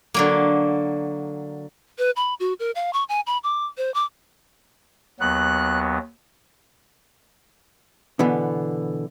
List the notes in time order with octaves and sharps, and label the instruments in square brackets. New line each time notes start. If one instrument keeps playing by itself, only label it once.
[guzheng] D3 F#3 A#3
[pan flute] B4
B5
F#4
A#4
F5
C#6
G#5
B5
D6
C5
D6
[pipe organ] D#2 F#3 B3 [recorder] F#6
[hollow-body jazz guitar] B2 D3 E3 B3